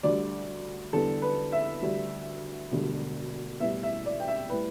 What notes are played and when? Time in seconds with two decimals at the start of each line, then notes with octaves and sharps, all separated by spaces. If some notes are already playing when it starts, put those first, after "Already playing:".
0.03 D2 D3 G3 D5
0.93 E2 D3 G3 A4
1.22 B4
1.52 E5
1.82 D2 D3 G3
2.71 E1 D2 D3 G3
3.60 B1 A2 E3 G3 E5
3.83 E5
4.06 D5
4.20 G5
4.28 E5
4.50 A2 G3 B4